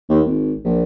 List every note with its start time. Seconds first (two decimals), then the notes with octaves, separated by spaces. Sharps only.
0.09 D#2
0.26 G#1
0.64 A#1